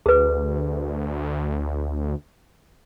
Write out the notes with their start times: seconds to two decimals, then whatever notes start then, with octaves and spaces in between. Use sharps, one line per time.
0.06 D2 G#4 B4